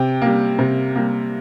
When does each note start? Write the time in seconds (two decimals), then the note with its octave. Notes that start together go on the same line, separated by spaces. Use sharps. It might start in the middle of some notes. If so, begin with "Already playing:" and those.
Already playing: C3 G5
0.22 G3 A#3
0.59 C3
0.96 G3 A#3